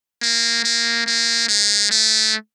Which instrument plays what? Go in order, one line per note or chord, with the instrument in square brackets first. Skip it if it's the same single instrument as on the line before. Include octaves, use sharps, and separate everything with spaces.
[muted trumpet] A#3
A#3
A#3
G#3
A3